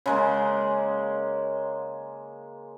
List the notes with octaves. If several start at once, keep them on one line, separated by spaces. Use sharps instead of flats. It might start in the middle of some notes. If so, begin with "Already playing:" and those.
C#3 G#3 A#3